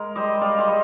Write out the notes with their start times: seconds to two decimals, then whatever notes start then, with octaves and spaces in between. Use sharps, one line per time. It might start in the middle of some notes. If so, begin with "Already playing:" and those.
Already playing: G#3 A#4
0.16 G3 C5 D#5
0.41 G3 D5 F5
0.59 C5 D#5
0.67 G3